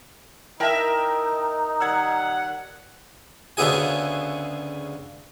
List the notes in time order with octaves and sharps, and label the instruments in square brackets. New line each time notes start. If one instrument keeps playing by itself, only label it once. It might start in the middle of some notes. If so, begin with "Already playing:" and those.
[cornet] D#4 [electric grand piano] E4 G5 A5 [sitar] A#4 E5
[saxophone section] D#3 G3 F#5 [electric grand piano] E6 F#6 G#6
[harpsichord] D2 C#3 B3 E4 G#4 G#5